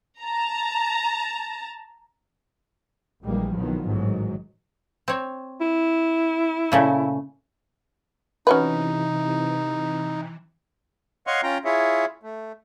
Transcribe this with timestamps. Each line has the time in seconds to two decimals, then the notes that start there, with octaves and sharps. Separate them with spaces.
0.21 A5 A#5
3.24 A#1 E3 G3 G#3 A#3
3.55 C2 B2 D#3 F3 F#3 B3
3.86 A1 G#2 D#3 F#3
5.08 C4 C#5
5.61 E4
6.72 A#2 C#3 A3
8.47 C3 E3 C#4 D#4 F#4 B4
11.27 C#5 D#5 F5 F#5 C6 C#6
11.43 C#4 F4 G5 A#5
11.65 E4 F4 G#4 C#5 E5
12.23 A3